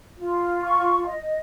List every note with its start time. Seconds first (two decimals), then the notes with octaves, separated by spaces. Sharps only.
0.19 F4
0.63 C#6
1.07 D#5